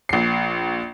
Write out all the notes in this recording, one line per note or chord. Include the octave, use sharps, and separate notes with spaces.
A#1 C7